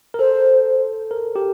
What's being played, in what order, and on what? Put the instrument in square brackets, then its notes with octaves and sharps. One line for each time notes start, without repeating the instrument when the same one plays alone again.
[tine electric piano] A#4
[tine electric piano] A4 [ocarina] C5
[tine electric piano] A#4
G4